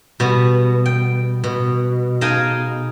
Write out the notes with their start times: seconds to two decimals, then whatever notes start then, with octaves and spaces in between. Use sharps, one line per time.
0.20 B2 G3 B3
0.86 G5
1.44 B2
2.21 D#4 G#4 D#5 F5 G5 A5